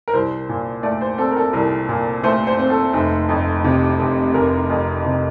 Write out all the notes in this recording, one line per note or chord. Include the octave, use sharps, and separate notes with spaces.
A#4
C2 C5
A#2
A3 D5
C5
C4 A4
A#4
A4
C2 A#4
A#2
A3 C5
C5
C4
A4
F1
F2
C3
F1
F1 A#4
F2
C3